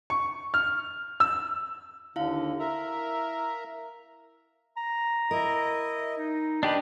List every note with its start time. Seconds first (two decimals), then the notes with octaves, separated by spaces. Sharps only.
0.10 C#6
0.54 F6
1.20 E6
2.16 D#2 D3 E4 F5
2.59 A#4 E5 A#5
4.77 A#5
5.31 E4 A#4 D#5
6.17 D#4
6.63 D4 G4 B4 D#5 A5 B5